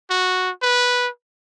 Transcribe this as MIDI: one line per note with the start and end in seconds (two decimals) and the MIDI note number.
0.10 0.50 66
0.62 1.09 71